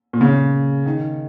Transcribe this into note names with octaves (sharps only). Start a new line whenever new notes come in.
A#2
C#3
D#3